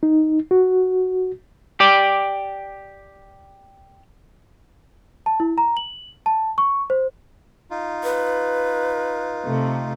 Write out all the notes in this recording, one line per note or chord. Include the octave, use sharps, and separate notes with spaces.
D#4
F#4
G4 D5
A5
E4
A#5
F#7
A5
C#6
C5
D#4 F4
B4
C3 A3